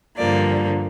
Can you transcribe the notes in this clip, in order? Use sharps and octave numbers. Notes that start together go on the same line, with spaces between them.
G2 D3 F3 A#3 D5